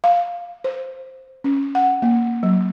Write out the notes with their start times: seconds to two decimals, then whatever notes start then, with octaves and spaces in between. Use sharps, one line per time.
0.04 F5
0.64 C5
1.44 C#4
1.75 F#5
2.02 A#3
2.43 F#3